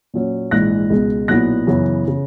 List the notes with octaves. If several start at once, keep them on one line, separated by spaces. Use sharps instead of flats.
A#2 F#3 C#4
A#1 G#2 E3 F#6 A#6
C#2 B2 G#3
B1 A#2 F#3 B3 E4 F#6 A#6
F#2 C#3 E3 B3
C#3